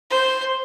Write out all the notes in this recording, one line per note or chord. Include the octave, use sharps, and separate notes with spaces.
C5